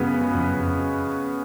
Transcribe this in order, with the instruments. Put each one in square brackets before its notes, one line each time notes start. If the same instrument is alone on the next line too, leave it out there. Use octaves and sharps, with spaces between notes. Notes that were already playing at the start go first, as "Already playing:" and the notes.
Already playing: [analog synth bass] F#2 [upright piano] C#3 G#3 B3 F#4 B4
[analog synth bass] F2
F#2
F2